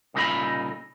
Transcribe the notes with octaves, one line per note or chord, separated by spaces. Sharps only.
C2 A#2 C#3 D#4 A4 B5